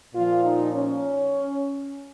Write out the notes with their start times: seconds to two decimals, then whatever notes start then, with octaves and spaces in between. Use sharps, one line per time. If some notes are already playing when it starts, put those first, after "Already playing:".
0.14 A#2 F3 F4
0.44 D#4
0.72 C#4